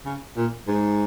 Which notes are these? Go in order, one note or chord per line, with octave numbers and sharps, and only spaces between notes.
C#3
A#2
G#2